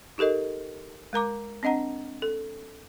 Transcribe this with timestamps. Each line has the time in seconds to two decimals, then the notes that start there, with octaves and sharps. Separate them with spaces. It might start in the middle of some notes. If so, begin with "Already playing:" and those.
0.18 D#4 G4 A4 A#4 D#5
1.13 G#3 A#4 A#5 D6
1.63 C4 D4 D#5 F#5 A#5
2.22 A4